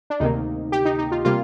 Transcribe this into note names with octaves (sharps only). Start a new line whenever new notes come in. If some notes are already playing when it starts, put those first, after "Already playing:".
D4
D2 C3 D#3 A#3 D#4
G4
D#4
D#4
F4
C3 G3 A#3 F4